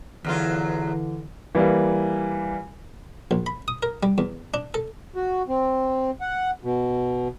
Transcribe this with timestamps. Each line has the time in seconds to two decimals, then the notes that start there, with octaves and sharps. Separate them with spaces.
0.24 E2 D3 E3 F#3 F4
1.55 E3 G3 A#3
3.31 A#1
3.46 B5
3.68 D#6
3.83 A#4
4.03 G3
4.18 E2
4.54 D4
4.74 A4
5.15 F#4
5.48 C4
6.21 F#5
6.63 B2